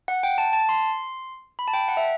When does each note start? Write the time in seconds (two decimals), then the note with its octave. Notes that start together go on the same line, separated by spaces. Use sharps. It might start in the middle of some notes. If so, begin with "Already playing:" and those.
0.08 F#5
0.23 G5
0.38 A5
0.53 A5
0.69 C6
1.59 B5
1.68 A5
1.73 G5
1.88 F#5
1.97 E5